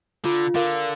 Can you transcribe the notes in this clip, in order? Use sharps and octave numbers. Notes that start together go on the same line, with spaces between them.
D3 F4
D3 A#4 F5